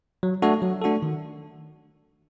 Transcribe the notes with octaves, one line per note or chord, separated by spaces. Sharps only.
F#3
A3 D4 F#4 A4
F#3
A3 D4 F#4 A4
D#3